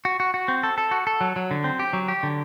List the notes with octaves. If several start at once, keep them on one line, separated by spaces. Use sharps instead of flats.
F#4
F#4
F#4
C4
A4
A4
F#4
A4
F#3
F#3
D3
C4
G4
F#3
G4
D3